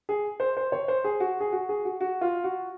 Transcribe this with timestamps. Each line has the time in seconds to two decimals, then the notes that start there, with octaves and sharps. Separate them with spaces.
0.09 G#4
0.40 C5
0.57 C5
0.72 C#5
0.88 C5
1.04 G#4
1.20 F#4
1.40 G#4
1.53 F#4
1.69 G#4
1.85 F#4
2.01 F#4
2.21 F4
2.44 F#4